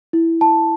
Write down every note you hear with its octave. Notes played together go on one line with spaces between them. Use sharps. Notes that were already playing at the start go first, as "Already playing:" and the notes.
E4
A5